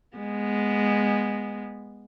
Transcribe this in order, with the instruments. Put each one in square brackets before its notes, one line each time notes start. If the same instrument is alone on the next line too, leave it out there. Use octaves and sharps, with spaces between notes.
[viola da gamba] G#3 B3